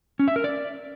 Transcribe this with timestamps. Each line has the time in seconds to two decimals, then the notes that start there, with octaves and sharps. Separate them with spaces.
0.19 C#4
0.28 E5
0.36 A#4
0.44 D5